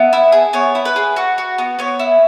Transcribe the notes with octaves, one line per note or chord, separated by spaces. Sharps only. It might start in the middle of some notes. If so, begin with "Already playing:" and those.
Already playing: B3 E5
E4
G#4
B3 C#5
E4
B4
G#4
F#4
F#4
B3
B3 C#5
E4